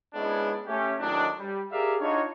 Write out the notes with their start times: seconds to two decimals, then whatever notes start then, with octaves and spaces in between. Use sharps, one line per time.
0.14 G#2 G#3 B3 C#4 D4 E4
0.67 A3 C#4 G4
0.99 A2 D#3 F#3 G#3 D4
1.39 G3
1.71 G4 G#4 A#4 D5 E5 F5
2.01 D4 D#4 F4 F#4 C#5